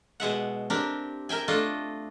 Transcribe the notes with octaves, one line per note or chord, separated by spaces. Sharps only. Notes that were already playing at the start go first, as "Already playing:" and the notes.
B2 G#3 E5 F#5
C4 D4 G4 A#4
A#4 E5 G5 G#5
A3 D4 F4 D#5